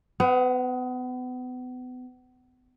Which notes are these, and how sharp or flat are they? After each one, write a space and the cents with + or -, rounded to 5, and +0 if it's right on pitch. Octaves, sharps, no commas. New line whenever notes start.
B3 +35 F#5 -15